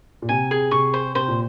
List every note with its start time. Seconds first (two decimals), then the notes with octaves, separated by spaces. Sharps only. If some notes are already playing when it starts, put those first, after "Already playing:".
0.22 A#2
0.29 C3 G#5
0.51 G#4
0.71 C3 C#6
0.94 C5
1.15 C3 C5
1.28 A#2